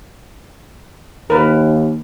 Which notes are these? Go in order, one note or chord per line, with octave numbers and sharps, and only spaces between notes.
D#2 A#4 B4